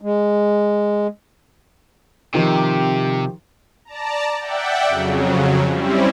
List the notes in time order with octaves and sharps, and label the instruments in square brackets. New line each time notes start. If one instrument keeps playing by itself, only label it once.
[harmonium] G#3
[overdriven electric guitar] C3 [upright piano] D#3 F3 D#4 [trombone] G4
[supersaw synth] D5 A5 A#5
D5 E5 F#5 G5
F2 C#3 F#3
G3 C4 C#4 E4